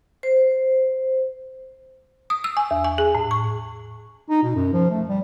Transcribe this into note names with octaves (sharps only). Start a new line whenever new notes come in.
C5
D#6
E6
G#5
E2
G#5
G#4
A2
C#6
D#4
B2
F#2
F3
A3
G3